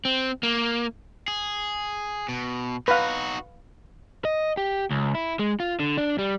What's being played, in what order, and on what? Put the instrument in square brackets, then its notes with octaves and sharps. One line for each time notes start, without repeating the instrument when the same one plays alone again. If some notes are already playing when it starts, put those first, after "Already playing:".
[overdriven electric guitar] C4
A#3
G#4
B2
[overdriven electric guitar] D#4 F#4 [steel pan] B4 F5
[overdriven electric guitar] D#5
G4
C#2
E4
G#3
F4
D3
D4
G3